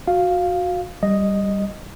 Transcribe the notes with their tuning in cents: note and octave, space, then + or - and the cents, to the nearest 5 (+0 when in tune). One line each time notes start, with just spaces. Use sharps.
F#4 -15 F5 +0
G3 +0 D#5 +0